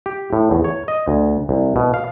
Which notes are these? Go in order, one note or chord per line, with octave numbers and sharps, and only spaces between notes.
G4
A2
E2
C#5
D#5
D2
C2
B2
F5